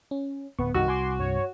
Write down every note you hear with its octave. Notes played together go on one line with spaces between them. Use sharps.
C#4
D1 B3 C#6
C2 G2 D#3 F#4 E6
F#5 G#5 C6 D6
G2 C#5